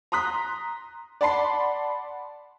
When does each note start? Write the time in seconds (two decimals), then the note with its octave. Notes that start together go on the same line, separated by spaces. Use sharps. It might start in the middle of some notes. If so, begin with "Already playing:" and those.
0.12 A#5 C6 D#6 F#6 B6
1.21 D5 F#5 A5 B5 C6 C7